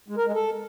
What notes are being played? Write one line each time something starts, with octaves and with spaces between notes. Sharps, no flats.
G#3
A#4
G#3
A4